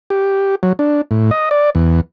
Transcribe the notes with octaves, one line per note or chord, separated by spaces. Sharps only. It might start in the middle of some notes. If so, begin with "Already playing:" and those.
G4
F#3
D4
A2
D#5
D5
E2